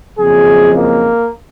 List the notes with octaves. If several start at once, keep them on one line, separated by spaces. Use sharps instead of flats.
F#1 F2 C#3 F3 G#3 G#4
A#3